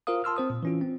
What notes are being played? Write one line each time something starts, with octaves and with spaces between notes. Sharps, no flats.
F4 A#4 C5 F5 D#6
A5 C6 E6 F6
C4 C5 D#6
A#2
E3 C#4 F4
C4